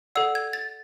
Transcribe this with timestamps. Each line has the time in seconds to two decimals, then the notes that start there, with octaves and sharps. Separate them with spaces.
0.15 A4 D5 F#5 E6
0.35 G#6
0.53 A6